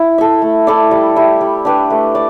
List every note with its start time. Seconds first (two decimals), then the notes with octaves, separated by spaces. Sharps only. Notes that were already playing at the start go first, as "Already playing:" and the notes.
Already playing: E4
0.18 A4 E5
0.42 A3
0.67 E4 A4 D5
0.91 G3
1.16 E4 G4 E5
1.41 G3
1.65 D4 G4 B4
1.90 A3
2.15 D5